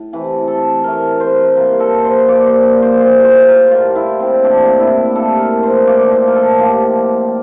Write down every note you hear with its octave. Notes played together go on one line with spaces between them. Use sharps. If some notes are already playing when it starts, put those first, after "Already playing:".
Already playing: A2
C3 E3 A3
A4
C3 E3 A3 A#4
C5
A#2 G3 A#3 A#4
A4
C5
A#2 G3 A#3 D5
C5
D5
C5
A2 G3 A#3 C5
C5
A#4
A2 G3 A#3 F4
E4
C4
A2 G3 A#3 D4
E4
A2 G3 A#3 A4
A#4
C5
A2 F3 A#3 D5
C5
A#4
A4
A2 F3 A#3 G4